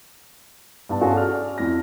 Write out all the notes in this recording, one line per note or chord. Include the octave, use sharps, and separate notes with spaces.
G2 B3 A5
C#4 F4 F#4 G#4 A4
D5 F6
F2 E4 A#6